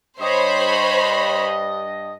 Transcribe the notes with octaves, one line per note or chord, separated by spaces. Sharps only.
G2 C5 C#5 D#5 B5